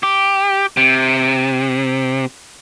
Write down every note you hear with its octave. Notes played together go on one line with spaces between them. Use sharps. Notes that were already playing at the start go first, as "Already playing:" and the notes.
G4
C3